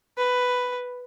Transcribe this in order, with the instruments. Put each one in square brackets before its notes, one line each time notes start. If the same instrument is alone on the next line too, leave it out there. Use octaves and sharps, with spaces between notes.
[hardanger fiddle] B4